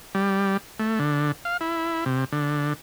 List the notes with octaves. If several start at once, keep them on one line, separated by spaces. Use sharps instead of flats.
G3
A3
D3
F5
E4
C3
D3